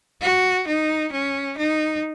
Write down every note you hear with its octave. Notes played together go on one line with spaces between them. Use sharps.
F#4
D#4
C#4
D#4